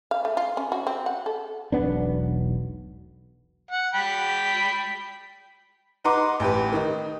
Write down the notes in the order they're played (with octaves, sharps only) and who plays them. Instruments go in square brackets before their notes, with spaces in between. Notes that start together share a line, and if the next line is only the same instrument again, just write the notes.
[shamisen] F5
A3
F4
C#4
F#4
C4
F#5
A4
[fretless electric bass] E1 B1 B3 D4
[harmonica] F#5
G5 B5
[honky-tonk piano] D#4 B4 F#5 A#5 C6 D6
A1 G4 B4
D#3 D#4